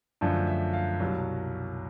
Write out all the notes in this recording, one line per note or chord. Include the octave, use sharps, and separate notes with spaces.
F#2 D3 F3 A3 E5
E5
F5
C2 B2 F#3